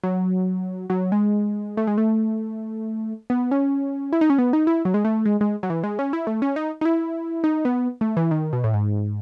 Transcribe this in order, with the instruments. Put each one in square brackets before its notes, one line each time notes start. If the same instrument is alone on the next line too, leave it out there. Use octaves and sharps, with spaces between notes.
[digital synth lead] F#3
F#3
G#3
A3
G#3
A3
B3
C#4
E4
D#4
C#4
B3
D#4
E4
F#3
G#3
A3
G#3
G#3
F#3
E3
G#3
C#4
E4
A3
C#4
D#4
D#4
E4
D#4
B3
A3
E3
D#3
B2
A2
G#2